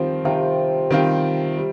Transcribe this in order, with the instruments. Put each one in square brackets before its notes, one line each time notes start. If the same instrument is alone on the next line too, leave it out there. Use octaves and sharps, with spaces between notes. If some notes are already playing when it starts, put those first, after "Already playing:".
Already playing: [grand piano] D#3 G3 C4 F4 [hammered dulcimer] F3
[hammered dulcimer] C3 [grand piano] D#3 G3 C4 F4
[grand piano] D#3 G3 C4 F4
G3